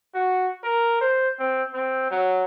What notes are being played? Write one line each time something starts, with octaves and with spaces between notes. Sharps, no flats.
F#4
A#4
C5
C4
C4
F#3